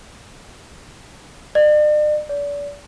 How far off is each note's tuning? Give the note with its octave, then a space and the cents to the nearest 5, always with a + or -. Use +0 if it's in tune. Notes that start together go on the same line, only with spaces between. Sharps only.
D5 +40
D5 -35